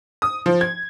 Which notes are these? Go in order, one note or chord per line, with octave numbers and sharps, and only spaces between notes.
D#6
F3
G#6